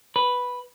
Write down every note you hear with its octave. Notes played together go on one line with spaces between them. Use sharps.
B4